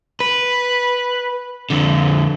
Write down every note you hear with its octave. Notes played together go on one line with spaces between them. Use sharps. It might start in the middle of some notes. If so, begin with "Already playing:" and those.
B4
F2 D3